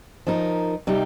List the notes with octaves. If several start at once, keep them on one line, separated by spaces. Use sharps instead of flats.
F3 D#4 A#4
C3 G3 D#4